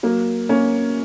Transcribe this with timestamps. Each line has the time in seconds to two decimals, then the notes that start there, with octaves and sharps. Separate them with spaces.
0.03 F#3 A#3
0.49 A#3 C#4